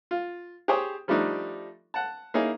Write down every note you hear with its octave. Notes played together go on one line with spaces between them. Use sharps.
F4
G4 G#4 C5 C#5 G5 D#6
F3 G3 A3 D4 D#4
F#5 A5
A#3 C#4 D#4 E4 G#4